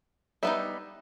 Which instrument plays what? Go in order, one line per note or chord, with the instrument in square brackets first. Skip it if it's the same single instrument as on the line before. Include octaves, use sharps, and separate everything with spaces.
[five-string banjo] G3 B3 D#4 E5